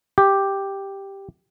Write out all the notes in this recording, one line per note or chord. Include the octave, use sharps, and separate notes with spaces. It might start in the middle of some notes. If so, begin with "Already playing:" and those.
G4